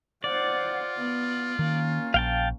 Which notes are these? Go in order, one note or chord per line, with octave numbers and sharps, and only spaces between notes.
F4 C5 D5 F#5
B3
D#3 A#3 C#4
A#1 F5 G5 A5